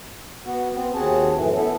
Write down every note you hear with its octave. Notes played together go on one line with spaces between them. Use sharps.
B3 F#4
B3 C4
D#2 C4 F#4 G#4 A5
F#2 A2 E3
B3 E4 A4